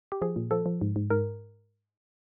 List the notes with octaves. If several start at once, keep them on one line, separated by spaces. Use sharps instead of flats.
G4
F3 G#4
A#2
F3 A4
F3
G#2
G#2
G#2 A#4